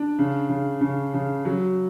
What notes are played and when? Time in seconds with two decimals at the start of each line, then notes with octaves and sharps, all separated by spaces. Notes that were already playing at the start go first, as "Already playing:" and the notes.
Already playing: D4
0.19 C#3
0.49 C#3
0.81 C#3
1.14 C#3
1.45 F#3